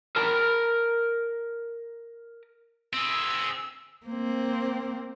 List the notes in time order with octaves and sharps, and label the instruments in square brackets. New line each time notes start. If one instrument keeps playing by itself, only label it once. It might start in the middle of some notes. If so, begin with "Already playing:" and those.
[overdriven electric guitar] A#4 A5
[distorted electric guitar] C4 G#4 [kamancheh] E6
[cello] A#3 C4